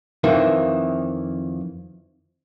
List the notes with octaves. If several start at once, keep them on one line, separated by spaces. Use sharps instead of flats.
F2 D#3 E3